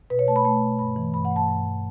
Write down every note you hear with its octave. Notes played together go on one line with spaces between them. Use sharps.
B2 B4
C#5
A3 A5
B5
A3 A5
B2
G2 B5
E3
G2 B5
F#5
A3
A5
G2
E3